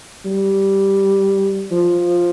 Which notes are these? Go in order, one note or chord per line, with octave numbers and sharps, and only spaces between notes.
G3
F3